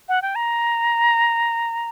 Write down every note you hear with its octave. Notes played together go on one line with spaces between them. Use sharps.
F#5
G5
A#5